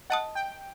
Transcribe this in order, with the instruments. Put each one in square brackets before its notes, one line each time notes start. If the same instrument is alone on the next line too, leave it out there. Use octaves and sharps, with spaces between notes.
[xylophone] D#5 A5 D#6 [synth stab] F#5
[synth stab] G5